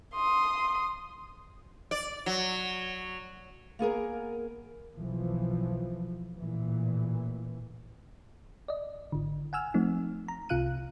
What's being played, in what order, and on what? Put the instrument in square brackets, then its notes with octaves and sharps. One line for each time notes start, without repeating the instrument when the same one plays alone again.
[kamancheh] C6 D#6
[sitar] D5
F#3
[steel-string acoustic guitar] A#3 B3 G#4 A#4
[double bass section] B1 E3 F3
A1 A#2 E3
[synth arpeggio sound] D5 D#5
G#1 D3
F#5 G#5 E6 F6
F3 A3 C4 D#4
A#5
C2 C3 F4 F5 F#6 D#7